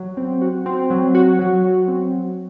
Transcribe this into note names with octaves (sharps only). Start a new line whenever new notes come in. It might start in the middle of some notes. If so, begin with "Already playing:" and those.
Already playing: F#3
C4
F#4
C4
F#3
F#4
F#3
F#3
C4
F#3